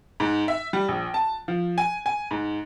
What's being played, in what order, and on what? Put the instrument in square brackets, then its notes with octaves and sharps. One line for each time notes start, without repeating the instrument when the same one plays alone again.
[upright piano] G#2
E5
G3
A#1
A5
F3
G#5
G#5
G#2